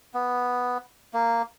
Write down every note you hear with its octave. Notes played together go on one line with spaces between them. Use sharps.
B3
A#3